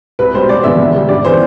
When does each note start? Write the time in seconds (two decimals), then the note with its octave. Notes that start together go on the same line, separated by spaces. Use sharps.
0.19 C2 B4
0.34 B2 G3 C5
0.49 E1 D5
0.64 E2 D3 F3 B3 E5
0.79 E2
0.94 D3 G3
1.09 G2 D5
1.25 E3 B3 C5